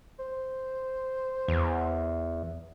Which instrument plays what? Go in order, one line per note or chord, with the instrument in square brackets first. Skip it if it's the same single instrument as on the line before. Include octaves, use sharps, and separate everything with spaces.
[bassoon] C5
[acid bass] E2